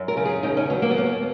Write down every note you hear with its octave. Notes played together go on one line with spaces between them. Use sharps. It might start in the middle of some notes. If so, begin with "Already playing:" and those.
Already playing: F#2
A#4
C#3
G#4
D#2 D#4
C#4
F#3 B3
A#3
B3
D#2 A#3